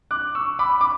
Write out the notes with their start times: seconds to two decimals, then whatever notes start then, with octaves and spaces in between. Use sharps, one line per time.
0.11 D6 F#6
0.35 C#6 E6
0.59 B5 D6
0.81 D6